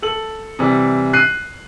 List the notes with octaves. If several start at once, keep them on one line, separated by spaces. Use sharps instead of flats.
A4 F#7
C3 E3 G3
F#6 C7 D#7